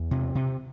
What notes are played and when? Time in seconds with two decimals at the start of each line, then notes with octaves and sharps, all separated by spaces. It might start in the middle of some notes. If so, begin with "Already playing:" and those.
Already playing: E2
0.11 C3
0.35 C3